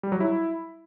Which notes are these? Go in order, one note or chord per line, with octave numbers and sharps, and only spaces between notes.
G3
F#3
E4